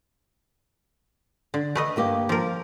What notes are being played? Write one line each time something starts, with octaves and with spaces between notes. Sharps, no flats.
D3
A3 B4 D#5
G2 A#3 G4
F3 A#4